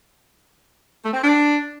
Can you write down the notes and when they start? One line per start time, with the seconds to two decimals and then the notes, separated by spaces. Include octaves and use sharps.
1.04 A3
1.13 C4
1.23 D4